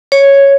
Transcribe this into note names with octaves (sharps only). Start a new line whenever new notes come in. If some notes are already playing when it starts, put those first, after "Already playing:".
C#5